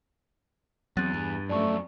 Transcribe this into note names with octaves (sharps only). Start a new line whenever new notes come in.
E2 F#3 C4 F#6 A6 D#7
G2
F#2 F3 A3 D5 A5 C#6